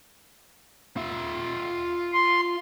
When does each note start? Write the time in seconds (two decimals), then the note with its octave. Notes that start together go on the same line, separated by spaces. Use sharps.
0.97 F4 E5
2.13 C6